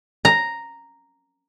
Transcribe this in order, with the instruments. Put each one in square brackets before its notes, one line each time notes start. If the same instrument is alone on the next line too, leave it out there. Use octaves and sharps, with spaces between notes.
[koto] A#5